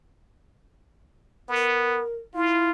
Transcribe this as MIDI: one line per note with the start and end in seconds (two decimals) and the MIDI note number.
1.49 2.02 59
1.49 2.14 70
2.34 2.72 64
2.34 2.72 65